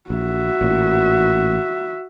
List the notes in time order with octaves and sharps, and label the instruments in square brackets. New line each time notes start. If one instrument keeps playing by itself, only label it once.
[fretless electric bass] A#1 [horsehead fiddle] F#4 E5
[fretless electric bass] A1 A#2